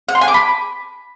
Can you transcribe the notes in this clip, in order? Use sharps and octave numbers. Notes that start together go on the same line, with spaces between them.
F#5
C6
G#5
D6
B5